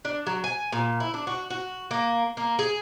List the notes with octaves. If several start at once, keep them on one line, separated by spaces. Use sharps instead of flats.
D4
F#3
G#5
A#2
E4
D4
F#4
F#4
A#3
A#3
G#4